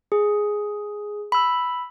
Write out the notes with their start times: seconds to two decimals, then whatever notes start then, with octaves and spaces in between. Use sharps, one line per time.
0.12 G#4
1.32 B5 E6